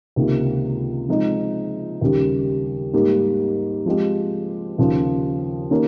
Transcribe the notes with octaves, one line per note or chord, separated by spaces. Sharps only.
C#2 C3 D#3 A#3
F3 G#3 C4 D#4
D#2 C#3 G3
G#2 G3 A#3
F3 G#3 C4 G4
D#2 C#3 F3
D#3 A#3 C#4 G4